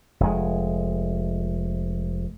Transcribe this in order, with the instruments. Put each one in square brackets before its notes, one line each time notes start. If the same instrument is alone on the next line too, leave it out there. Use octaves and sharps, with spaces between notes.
[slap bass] F1 G#3